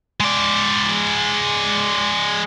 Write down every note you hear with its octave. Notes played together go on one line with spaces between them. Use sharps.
G#3 D5